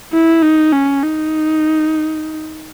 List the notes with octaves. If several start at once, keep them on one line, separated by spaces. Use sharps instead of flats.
E4
D#4
C#4
D#4